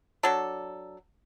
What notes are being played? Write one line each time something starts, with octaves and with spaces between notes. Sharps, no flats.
F#3 D4 A4